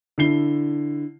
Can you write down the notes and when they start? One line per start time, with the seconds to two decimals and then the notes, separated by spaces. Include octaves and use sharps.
0.18 D3 E4 C7 G7